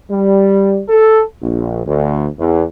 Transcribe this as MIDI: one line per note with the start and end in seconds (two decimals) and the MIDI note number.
0.10 0.81 55
0.89 1.22 69
1.42 1.82 34
1.86 2.26 38
2.39 2.63 40